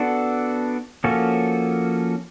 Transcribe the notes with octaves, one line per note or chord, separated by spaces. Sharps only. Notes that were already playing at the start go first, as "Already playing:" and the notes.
Already playing: B3 D4 F#4 A4
F3 A#3 C#4 F#4 A4